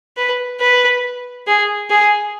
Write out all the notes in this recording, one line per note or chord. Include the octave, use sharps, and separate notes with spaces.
B4
B4
G#4
G#4